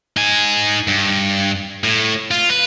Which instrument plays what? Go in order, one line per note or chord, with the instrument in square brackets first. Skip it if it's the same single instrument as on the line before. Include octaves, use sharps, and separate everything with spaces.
[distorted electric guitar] D#4 G#5
G2
A2
F4
B4